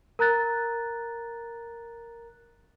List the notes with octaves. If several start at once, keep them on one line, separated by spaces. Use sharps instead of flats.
A#4 A#5 F#6 A6